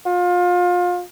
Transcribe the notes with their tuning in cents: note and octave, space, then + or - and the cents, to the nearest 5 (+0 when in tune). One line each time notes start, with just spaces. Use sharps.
F4 +30